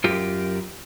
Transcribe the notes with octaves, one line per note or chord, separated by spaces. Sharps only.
F#2 F4 G4 A#4